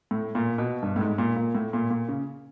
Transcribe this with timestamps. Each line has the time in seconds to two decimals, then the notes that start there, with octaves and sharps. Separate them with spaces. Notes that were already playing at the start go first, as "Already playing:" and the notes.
0.11 A2
0.35 A#2
0.58 B2
0.83 G2
0.96 A2
1.01 G#2
1.18 A#2
1.36 A#2
1.55 A2
1.73 A#2
1.90 A#2
2.08 C#3